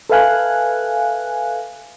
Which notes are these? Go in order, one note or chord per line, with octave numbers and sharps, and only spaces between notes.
A4 B4 E5 F5 G#5 F#6